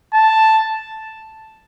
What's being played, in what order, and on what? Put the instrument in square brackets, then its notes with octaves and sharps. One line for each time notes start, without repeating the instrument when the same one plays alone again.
[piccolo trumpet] A5